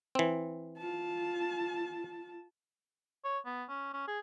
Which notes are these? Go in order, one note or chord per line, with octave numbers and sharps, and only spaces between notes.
E3 C4
F4 A5
C#5
B3
C#4
C#4
G#4